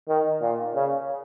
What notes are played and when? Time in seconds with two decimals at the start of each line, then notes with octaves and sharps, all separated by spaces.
0.09 D#3
0.41 A#2
0.75 C#3